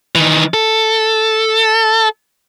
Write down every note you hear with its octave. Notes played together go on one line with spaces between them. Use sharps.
D#3 E3
A4